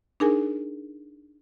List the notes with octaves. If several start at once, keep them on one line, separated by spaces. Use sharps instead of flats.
D4 D#4 G#4 A#4 G#5